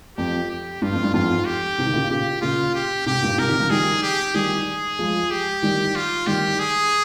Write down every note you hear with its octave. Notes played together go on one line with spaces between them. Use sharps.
F2 G4
G4
G2 F4
F2
G2
F2 G#2 F4
G4
G#2 C3
D#3
A#2 C#3
A#2 C#3 G4
A#2 C#3 F4
G4
G#2 C3 G4
G2 A#2
G#2 C3 A#4
C3 D#3
C#3 F3
D#3 G3 G#4
G4
D#3 G3 G#4
F3 G#3
G4
D#3 G3
F4
D#3 G3 G4
G#4